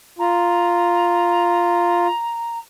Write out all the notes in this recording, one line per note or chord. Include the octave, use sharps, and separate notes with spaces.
F4 A#5